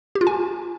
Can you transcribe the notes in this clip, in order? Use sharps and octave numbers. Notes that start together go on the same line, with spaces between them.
G4
F4
G#5